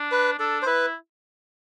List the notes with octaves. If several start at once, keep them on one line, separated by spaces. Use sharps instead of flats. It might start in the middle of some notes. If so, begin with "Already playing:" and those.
Already playing: D4
B4
D4 A4
C5
E4 B4